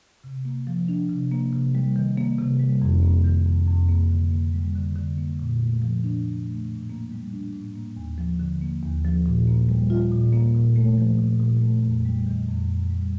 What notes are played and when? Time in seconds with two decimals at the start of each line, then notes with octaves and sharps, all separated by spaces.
0.24 C3
0.45 A#3
0.67 F3
0.88 D4
1.09 C3
1.31 A#3
1.53 C3
1.75 G3
1.96 D#3
2.17 A#3
2.38 C3
2.60 G3
2.82 F2
3.03 A#3
3.24 D#3
3.46 F2
3.67 F2
3.89 A#3
4.10 D3
4.32 A#3
4.53 G3
4.75 D3
4.96 D3
5.18 A#3
5.39 A#2
5.61 A3
5.82 F3
6.04 D4
6.24 A#2
6.47 A3
6.68 A2
6.90 A#3
7.11 G3
7.33 D4
7.54 A2
7.76 A#3
7.97 D#2
8.18 F3
8.40 D3
8.61 A#3
8.83 D#2
9.04 F3
9.26 A#2
9.47 A#3
9.69 G3
9.90 F4
10.12 A#2
10.33 A#3
10.55 A#2
10.76 A3
10.98 F3
11.19 A#2
11.40 A#2
11.62 A3
11.83 F2
12.05 G3
12.27 D#3
12.48 F2
12.69 F2
12.90 G3